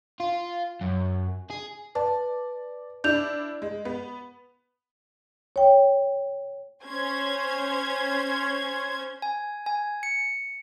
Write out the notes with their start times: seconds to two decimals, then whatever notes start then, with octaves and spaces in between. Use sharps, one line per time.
0.20 F4
0.81 F#2
1.51 G#4
1.95 B4 D5 A5
3.04 D4 E4 G6 F7
3.62 G#3
3.85 B3
5.56 C#5 G5
6.85 C#4 C5 G#6
9.22 G#5
9.66 G#5
10.03 C#7